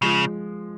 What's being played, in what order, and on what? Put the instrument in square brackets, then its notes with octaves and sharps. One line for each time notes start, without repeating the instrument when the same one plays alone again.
[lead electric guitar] C#3 [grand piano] F3 G#3